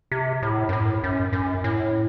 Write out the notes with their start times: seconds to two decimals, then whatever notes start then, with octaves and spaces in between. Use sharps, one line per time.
0.12 C3
0.42 A2
0.69 F#2
0.73 A2
1.04 F#2
1.33 F#2
1.64 A2